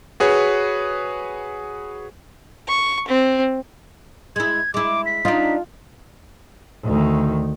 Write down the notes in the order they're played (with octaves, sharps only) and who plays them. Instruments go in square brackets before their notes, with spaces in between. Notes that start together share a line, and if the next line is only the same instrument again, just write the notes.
[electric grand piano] F#4 G#4 B4 C#5
[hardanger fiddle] C#6
C4
[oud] G#3 E4 [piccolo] G#6
[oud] G#3 E4 [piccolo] D6
[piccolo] B6
[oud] D4 D#4 [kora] F4
[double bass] D2 D#3